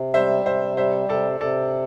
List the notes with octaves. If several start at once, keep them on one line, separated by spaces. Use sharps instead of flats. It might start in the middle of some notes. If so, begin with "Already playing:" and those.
Already playing: C3
G3 C5 E5
C3 C5 E5
G3 C5 E5
C3 A4 D5
C3 A4 D5